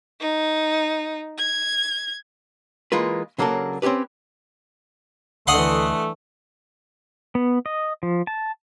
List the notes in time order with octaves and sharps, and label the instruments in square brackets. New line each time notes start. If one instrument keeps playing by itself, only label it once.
[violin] D#4
G#6
[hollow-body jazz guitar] E3 G#3 A#3 F4 B4
C#3 F#3 A#3 D4 A4
C4 C#4 F4 G4 B4
[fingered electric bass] D2 [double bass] D3 E3 [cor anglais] A3 [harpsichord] D#5 F#5 C6
[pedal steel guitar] B3
D#5
F3
A5